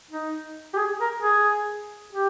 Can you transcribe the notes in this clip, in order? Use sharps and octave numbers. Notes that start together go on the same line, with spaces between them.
D#4
G4
G#4
A#4
G#4
G4